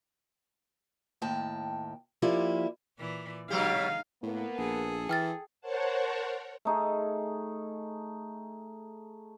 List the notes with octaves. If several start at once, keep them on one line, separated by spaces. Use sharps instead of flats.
D#2 A2 G5 A5
F3 G3 A#3 E4 F4 G4
A#2 E3 D5
B2 F#3 G#3 D#4 G4 F5
A2 A#3 B3
A#1 G#4 A4
E3 G5 F6 A6
A#4 C5 C#5 F#5 A5
A3 D#4 G#4